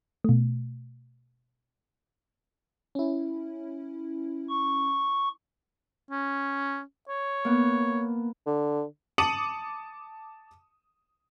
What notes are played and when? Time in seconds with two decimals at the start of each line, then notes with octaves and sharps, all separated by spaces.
0.24 B2 A3
2.95 C#4 E4
4.49 C#6
6.11 C#4
7.09 C#5
7.45 A#3 B3
8.46 D3
9.18 A5 D6 D#6 C#7 D#7 F#7